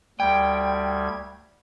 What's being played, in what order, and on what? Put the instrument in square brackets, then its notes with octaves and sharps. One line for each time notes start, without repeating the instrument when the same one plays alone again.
[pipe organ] D2 G3 G#6 [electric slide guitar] G5